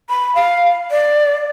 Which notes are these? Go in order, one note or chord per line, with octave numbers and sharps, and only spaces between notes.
B5
F5
D5